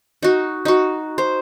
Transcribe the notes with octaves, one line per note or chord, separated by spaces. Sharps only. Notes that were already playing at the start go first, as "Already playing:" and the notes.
D#4 F#4
D#4 F#4
C5